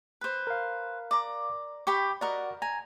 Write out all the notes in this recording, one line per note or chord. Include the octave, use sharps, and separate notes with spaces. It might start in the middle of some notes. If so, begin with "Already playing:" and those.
B4 C5
A#4 F5
D5 A#5
G4 G5 B5 C#6
F#4 A#4 D5 D#5 F#5
G#5 A#5